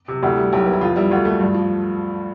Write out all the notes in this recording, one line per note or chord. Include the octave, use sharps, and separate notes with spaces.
C3
D2 E4 G4
G3
B1 E4 G4
B3
E4
F2 F4
G3 E4
D2 F4
A3
G2
F3